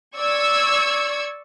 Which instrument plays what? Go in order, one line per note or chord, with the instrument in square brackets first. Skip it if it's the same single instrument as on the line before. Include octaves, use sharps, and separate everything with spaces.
[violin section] D5 C#6 E6 G#6